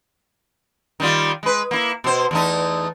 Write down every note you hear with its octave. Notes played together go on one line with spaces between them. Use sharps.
D#3 G3 F4
G#3 B4
A#3 E4
B2 C5
E2 A3 D#4